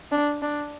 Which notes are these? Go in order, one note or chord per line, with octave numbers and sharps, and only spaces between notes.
D4
D4